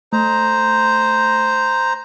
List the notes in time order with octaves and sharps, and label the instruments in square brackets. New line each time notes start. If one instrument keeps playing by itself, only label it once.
[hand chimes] A3 [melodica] C5 A#5